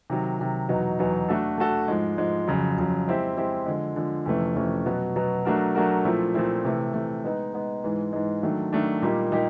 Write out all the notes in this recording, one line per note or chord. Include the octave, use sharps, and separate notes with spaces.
C3 D#3 F#3
C3 D#3 F#3
E2 B2 F#3 B3 D#4
E2 B2 F#3 B3 D#4
A3 D4 F#4 A4
A3 D4 F#4 A4
G#2 F3 G#3
G#2 F3 G#3
F2 C#3 F#3
F2 C#3 F#3
G#3 C4 E4 G4
G#3 C4 E4 G4
D3 F3 G#3
D3 F3 G#3
F2 C3 E3 A3 C#4
F2 C3 E3 A3 C#4
B2 F#3 B3
B2 F#3 B3
F#3 A3 D4 F#4 A#4
F#3 A3 D4 F#4 A#4
A#2 F3 A3 C4 E4
A#2 F3 A3 C4 E4
C3 E3 A3
C3 E3 A3
G#3 B3 D#4
G#3 B3 D#4
G#2 E3 G#3
G#2 E3 G#3
D#3 F#3 A3 D4
D#3 F#3 A3 D4
A#2 G3 A#3 D#4 G4
A#2 G3 A#3 D#4 G4